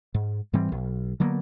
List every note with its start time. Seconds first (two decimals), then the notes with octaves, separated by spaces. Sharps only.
0.14 G#2
0.53 G#2 E3 G3 C4
0.72 B1
1.20 D3 F#3 A#3 B3